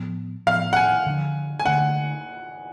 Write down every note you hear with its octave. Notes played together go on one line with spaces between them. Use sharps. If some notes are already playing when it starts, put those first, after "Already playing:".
Already playing: A2 F3 B3
A2 F3 B3 F5
F#5
G#5
D3 F3 A3 D4
G#5
D3 F3 A3 D4 F#5